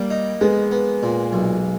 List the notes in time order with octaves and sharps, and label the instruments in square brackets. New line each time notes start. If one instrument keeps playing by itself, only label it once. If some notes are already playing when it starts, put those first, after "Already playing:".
Already playing: [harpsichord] G3 [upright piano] A#3
[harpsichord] D#4
[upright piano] G#3 [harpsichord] B3
[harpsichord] B3
A#2
B1